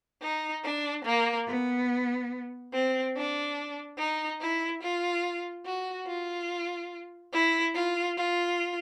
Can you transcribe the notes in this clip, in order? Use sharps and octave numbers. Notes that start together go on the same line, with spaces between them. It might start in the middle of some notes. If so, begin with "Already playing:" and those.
D#4
D4
A#3
B3
C4
D4
D#4
E4
F4
F#4
F4
E4
F4
F4